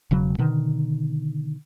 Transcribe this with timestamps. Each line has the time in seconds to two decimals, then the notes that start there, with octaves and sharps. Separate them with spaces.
0.11 E1 C#3 F#3
0.38 B2 D3 D#3